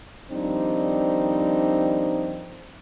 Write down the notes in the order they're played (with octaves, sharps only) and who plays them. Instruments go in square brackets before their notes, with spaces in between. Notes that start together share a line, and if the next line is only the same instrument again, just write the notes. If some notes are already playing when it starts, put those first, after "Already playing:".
[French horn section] D#3 F3 G3 C4 D4 D#4